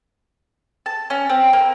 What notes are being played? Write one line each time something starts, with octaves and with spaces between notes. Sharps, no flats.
A5
C#4
C4
A#3